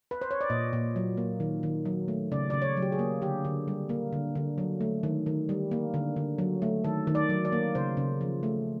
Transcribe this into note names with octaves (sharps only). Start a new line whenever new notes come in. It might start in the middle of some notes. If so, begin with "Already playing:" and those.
B4
C5
C#5
D5
A#2 D#5
A#2
F#3
A#3
D#3
D#3
F#3
A3
C#3 D5
C#3 D5
C#5
F#3
G4
G#4
A#3
D3 G4
D3
G3
A#3
D3
D3
F#3
A3
D#3
D#3
G3
A#3
D3
D3
F#3
A3
D#3 A4
D#3
D5
F#3
D5
A#3
C#3 C5
C#3
F3
A3